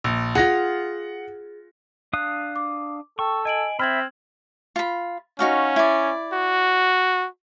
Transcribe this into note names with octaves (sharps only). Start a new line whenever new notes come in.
A#1
F4 G#4 F#5 A#6
D4 F5 D#6 F#6
D6
A4 G5 C#6
D#5 G#5 D7 F#7
C4 E5 B5 F6 G#6 F#7
F4 B5
C#4 D#4 F#4 F5
E4 D5
F#4